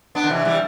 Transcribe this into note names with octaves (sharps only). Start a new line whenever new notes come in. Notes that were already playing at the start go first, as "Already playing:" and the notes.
B3 D4
D3
C3 E3
E3 G3